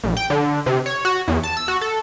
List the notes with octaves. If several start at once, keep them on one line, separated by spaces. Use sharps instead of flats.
A#1
G5
D3
C3
C#5
F#4
E2
A5
E6
F#4
A4